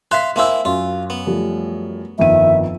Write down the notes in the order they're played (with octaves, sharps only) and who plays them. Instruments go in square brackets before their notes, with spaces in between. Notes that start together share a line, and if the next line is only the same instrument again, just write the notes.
[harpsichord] E5 F5 C6 [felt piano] F#6 B6
[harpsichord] A#3 C4 E4 [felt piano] E5 E6 [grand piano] G#5
[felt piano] F#2 [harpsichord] F4
[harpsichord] B3
[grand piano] F3 G3 A3
[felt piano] G1 D#3 D#7 [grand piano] F2 [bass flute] E5